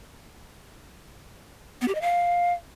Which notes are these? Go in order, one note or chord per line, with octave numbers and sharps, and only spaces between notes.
B3
G4
D#5
F5